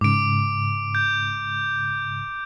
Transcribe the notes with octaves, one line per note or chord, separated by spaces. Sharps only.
G#2 C#3 D6 D7
G6